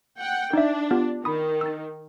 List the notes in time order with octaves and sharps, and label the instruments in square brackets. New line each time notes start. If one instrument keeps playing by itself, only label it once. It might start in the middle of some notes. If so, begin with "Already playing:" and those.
[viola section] F#5 G5
[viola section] D4 [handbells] D#4 E5
[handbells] B3 F4 G4
[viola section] D#3 [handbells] B5 D#6
[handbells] E6 A6